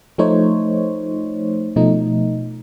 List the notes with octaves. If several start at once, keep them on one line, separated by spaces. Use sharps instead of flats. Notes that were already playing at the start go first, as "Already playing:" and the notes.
F3 A3 D#4 C5 C#5
B2 F3 A3 D#4